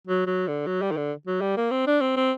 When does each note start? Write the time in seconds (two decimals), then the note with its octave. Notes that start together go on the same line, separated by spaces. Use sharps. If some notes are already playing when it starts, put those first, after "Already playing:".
0.07 F#3
0.27 F#3
0.48 D3
0.67 F#3
0.82 G3
0.92 D#3
0.97 D3
1.27 F#3
1.41 G3
1.57 A#3
1.71 C4
1.87 D4
2.01 C4
2.16 C4